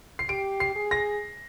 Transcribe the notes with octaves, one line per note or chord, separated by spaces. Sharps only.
C7
G4 D7
C7
G#4
A#6